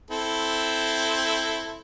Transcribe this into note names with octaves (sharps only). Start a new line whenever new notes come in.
C4 E4 A4